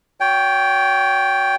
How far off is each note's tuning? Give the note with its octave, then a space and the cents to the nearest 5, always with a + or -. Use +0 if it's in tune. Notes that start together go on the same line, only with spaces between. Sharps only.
F#4 -20 C#5 +35 G5 +0